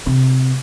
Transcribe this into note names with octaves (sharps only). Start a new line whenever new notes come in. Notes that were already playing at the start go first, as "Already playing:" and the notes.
C3